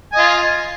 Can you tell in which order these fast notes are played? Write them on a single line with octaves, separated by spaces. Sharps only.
G#5 D#5 F4